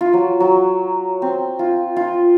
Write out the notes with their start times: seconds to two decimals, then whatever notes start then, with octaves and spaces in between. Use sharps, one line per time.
0.01 F4
0.13 F#3
0.40 F#3
1.22 C4
1.59 F4
1.96 F4